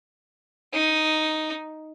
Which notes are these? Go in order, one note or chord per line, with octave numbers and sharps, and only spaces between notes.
D#4